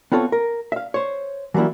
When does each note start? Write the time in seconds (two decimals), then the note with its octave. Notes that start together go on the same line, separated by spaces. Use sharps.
0.12 B3 C4 F4 A4 C#5
0.32 A#4
0.72 E5 F5
0.94 C5 C#5
1.54 E3 F#3 G3 A#3 E4